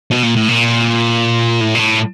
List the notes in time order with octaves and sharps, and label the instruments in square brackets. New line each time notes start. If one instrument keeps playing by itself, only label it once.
[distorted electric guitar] B2
A#2
A2
A#2
A2
A#2
A2